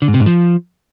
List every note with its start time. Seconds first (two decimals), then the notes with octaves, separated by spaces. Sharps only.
0.02 D3
0.08 G#2
0.14 C3
0.20 G#2
0.26 F3